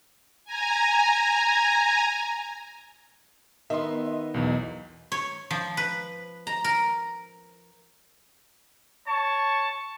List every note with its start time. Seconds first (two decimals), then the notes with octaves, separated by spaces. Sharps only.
0.45 G#5 A#5
3.70 D#3 B3 D#5 E5 C6
4.06 D#5
4.34 B1 E2
5.12 C#5
5.51 F3
5.77 B4
6.47 A#5
6.64 A#4
9.07 C#5 A5 C#6